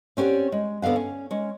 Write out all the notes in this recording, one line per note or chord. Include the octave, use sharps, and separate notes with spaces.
C4 C#4 G4 A#4 D5 F#5
G#3
D2 D3 B3 F5 F#5
C#4
G#3 C#4